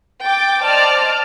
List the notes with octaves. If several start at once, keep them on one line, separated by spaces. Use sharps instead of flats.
G5 D6 A6
C5 D5 D#5 A5 D6 F6